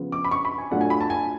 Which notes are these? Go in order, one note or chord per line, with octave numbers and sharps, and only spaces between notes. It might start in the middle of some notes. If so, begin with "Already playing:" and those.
Already playing: C#3 F3 B3 F4
D6
B5
C#6
B5
G#5
A2 F#3 A3 D4 F4 F#5
G#5
B5
A5
G#5